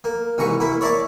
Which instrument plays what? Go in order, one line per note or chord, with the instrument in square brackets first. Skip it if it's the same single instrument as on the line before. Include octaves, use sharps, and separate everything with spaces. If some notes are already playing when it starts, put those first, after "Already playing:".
[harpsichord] A#3
C2 G#2 E3 A#5 C#6
A#3 E4 E5
C#5 D5 E5 A5 A#5 D6